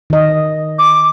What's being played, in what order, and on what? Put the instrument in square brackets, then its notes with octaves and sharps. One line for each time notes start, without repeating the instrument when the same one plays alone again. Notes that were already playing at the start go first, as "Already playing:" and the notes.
[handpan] D#3 D#5
[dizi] D6